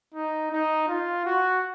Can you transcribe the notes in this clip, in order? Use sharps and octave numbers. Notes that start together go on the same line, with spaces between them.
D#4
D#4
F4
F#4